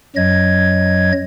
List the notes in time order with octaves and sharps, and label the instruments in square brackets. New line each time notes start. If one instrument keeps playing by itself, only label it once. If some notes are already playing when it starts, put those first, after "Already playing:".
[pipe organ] F#2 F#3 D#5 G#6